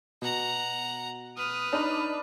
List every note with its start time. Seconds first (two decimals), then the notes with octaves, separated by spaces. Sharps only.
0.22 B2 F#5 A#5
1.37 B4 D#6 F6
1.73 D4 D#4 B5